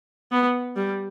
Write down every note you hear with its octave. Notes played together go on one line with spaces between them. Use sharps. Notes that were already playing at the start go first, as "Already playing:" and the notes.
B3
G3